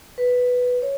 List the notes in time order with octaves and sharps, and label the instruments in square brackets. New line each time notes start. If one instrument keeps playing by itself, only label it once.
[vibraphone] B4
C#5